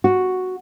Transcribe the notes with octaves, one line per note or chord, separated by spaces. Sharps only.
F#4